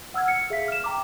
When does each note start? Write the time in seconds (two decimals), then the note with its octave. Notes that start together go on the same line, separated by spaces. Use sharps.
0.14 F#5 E6 F6 G#6
0.27 F6 C#7
0.50 G#4 E5 F5 B6
0.68 F6 E7
0.84 G5 A#5 D6